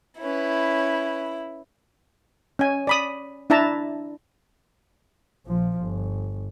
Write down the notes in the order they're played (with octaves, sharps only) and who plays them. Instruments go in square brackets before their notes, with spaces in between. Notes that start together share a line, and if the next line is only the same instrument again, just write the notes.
[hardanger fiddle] C#4 B4 [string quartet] E4
[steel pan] C#4 G#5
D5 B5 D#6
D4 E4 E5 A5 A#5
[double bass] A#1 F3
G1